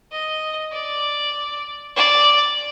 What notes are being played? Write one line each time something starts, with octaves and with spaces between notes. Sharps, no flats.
D#5
D5
D5